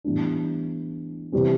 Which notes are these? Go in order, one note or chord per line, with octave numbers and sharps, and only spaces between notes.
A2 E3 G3 B3 D4
C3 E3 G3 C4